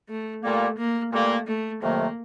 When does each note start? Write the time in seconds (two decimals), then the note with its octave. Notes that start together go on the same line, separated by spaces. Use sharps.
0.09 A3
0.43 A#2 G3 A3 A#3
0.78 A#3
1.13 A#2 G3 A3 A#3
1.47 A3
1.82 F2 C3 D#3 F#3 A3 A#3